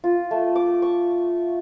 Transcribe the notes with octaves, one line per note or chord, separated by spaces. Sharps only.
F4
A3
D6
C#6